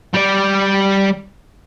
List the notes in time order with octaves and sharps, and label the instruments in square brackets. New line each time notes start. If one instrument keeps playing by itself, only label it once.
[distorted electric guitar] G3 D5